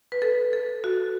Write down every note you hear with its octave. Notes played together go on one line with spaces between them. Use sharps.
B4
A4
A4
F#4